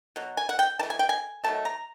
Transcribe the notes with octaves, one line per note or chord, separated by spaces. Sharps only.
B2 F#3
G#5
F#5
G5
E3 A3 A5
G#5
G5
G#5
D#3 F#3 A3 A5
A#5